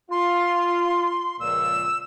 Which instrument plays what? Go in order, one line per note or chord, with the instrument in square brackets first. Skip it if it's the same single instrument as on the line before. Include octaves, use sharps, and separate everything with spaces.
[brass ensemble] F4 [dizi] C6
[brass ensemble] C#2 A#2 F3 [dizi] E6